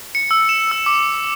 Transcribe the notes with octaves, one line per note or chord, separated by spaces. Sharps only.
C#7
E6
E7
E6
D6